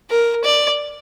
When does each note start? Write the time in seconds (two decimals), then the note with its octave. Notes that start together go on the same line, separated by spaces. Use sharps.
0.10 A#4
0.44 D5